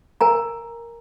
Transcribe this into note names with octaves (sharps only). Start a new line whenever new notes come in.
A#4 G#5 A#5